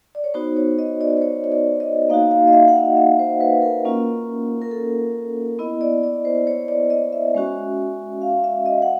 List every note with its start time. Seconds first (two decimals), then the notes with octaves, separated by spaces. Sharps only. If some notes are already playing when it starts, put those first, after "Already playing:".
0.15 D5
0.24 C#5
0.34 B3 D#4 F#4 C5
0.56 C#5
0.79 D#5
1.01 D5
1.17 C5
1.22 C#5
1.44 C#5
1.52 D5
1.80 D#5
2.09 A#3 D#4 F#4 F5
2.31 F5
2.47 D#5
2.53 E5
2.68 F#5
2.76 F5
2.96 E5
3.19 C5
3.41 B4
3.62 A#4
3.85 A#3 C#4 F4
4.62 A#4
4.71 A4
5.59 B3 E4 D#5
5.81 D5
6.04 D5
6.25 C5
6.47 C#5
6.68 D5
6.90 D#5
7.13 E5
7.35 G#3 C#4 F#4
8.22 F5
8.44 E5
8.66 D#5
8.82 F#5